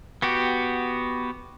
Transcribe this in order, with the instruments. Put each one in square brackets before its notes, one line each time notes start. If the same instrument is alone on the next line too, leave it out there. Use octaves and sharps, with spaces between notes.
[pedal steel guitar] B3 F#4 G4